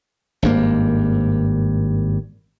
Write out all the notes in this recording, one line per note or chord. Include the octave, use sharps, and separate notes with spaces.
G#1 G2 A#3